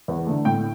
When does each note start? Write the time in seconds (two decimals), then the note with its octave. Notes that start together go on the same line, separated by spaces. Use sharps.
0.08 E2
0.27 D3 A3
0.45 A2 G5